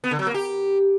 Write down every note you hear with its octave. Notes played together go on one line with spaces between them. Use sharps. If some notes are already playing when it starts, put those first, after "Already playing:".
B3
D3
F#3
A#3
G4